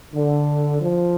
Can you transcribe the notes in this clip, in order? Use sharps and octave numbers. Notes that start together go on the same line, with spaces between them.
D3
F3